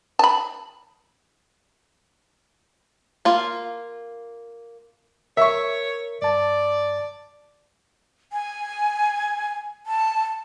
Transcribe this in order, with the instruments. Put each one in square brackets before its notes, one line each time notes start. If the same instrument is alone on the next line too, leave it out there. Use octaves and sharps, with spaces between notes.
[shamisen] A5 B5
[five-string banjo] A#3 F4
[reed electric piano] A#4 [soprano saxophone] C#5 [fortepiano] E5 C#6
[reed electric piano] G2 A5 [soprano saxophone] D5
[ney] G#5
A5